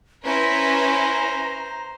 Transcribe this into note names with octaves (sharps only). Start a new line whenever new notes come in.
C#4 E4 B4 C5 A#5